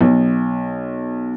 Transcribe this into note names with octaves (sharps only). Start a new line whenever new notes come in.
B1